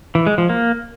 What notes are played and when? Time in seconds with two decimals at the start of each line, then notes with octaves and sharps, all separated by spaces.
0.15 E3
0.27 G#3
0.38 F3
0.49 A#3